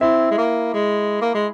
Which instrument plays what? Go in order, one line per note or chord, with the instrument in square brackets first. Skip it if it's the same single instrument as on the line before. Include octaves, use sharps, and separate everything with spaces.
[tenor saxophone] C4 [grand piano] E4 E5
[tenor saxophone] G#3
A#3
G#3
A#3
G#3